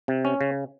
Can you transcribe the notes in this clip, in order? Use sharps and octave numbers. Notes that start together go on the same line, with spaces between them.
C3
C#4
C#3